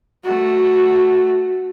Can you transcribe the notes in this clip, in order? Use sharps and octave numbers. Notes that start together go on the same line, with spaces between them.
A3 F#4